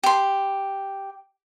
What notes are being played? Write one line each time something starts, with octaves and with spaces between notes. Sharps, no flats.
G4 C6